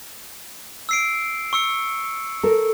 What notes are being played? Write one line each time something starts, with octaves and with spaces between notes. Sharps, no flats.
E6 C7 D7
C#6 E6 C#7
A4 A#4